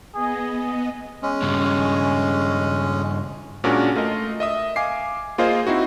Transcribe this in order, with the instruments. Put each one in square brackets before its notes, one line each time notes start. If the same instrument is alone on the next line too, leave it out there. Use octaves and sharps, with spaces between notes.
[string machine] B3 D#5 [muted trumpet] G#4
[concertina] G#3 C#4
[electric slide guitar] G2 C#3
[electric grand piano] A#2 G#3 C#4 D4 F#4 A#4
A3 F4 A#4 D#5
D#5 E5 D#6
F5 G#5 D6 C7
A#3 F4 G#4 C5 D#5 F5
C4 D#4 E4 F#4